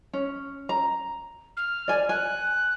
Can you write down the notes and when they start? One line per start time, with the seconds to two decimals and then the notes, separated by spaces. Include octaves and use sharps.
0.14 C#4
0.69 A#5
1.57 F6
1.88 D5 G#5
2.09 G#5 F#6